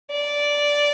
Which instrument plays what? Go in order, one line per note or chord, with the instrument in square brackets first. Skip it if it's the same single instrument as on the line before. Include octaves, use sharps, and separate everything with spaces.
[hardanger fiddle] D5